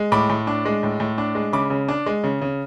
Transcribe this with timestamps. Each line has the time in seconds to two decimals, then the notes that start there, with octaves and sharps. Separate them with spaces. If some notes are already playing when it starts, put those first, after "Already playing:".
Already playing: G#3
0.12 A2 B5 D6
0.29 A2
0.47 D4
0.65 G#3
0.83 A2
1.00 A2
1.18 D4
1.35 G#3
1.53 C#3 B5 D6
1.70 C#3
1.89 D4
2.06 G#3
2.24 C#3
2.42 C#3